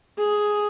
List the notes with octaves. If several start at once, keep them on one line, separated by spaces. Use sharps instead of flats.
G#4